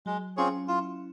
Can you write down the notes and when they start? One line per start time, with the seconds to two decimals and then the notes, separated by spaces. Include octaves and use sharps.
0.06 F#3 G#3
0.37 C4 C#4 F4 G#4 C#5
0.68 E4 F4